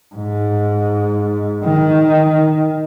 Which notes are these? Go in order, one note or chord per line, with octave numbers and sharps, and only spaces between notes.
G#2
D#3